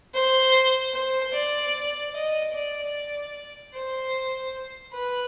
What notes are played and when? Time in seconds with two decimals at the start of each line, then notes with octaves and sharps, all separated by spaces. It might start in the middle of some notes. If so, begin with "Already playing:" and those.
0.14 C5
0.94 C5
1.33 D5
2.15 D#5
2.54 D5
3.74 C5
4.94 B4